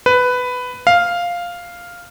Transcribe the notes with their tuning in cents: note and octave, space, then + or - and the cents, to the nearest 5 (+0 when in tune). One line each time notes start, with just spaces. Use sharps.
B4 +10
F5 +0